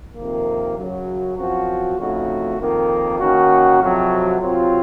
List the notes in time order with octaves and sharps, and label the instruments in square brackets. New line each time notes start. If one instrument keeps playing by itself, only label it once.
[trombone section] F2 C3 D#3 A#3
F#2 C#3 F#3
F#2 F3 C4 F#4
F2 C#3 A3 D#4 F#4
F2 D#3 A#3
D#3 A#3 C#4 F#4
F2 C3 F#3
C3 F#3 C4 F4